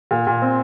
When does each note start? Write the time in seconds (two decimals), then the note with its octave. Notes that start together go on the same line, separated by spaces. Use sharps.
0.11 A#2
0.27 A#2
0.42 C4